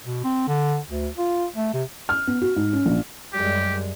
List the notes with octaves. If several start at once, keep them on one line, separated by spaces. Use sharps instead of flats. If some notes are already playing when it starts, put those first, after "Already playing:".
B2
C4
D3
D2
F4
A3
C3
F6
B3
F#4
G#2
C#4
A#1
F#2 G3 G#3 G4